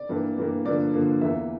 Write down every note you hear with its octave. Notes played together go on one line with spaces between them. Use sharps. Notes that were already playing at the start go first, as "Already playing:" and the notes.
Already playing: D5
G2 E3 A#3
G2 E3 A#3
G2 D3 F3 A#3 D5
G2 D3 F3 A#3
E2 E3 A#3 E5